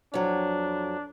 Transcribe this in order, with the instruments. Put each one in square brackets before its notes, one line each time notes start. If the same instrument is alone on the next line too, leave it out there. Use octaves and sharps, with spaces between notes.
[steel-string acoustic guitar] F2 F#3 [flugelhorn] D4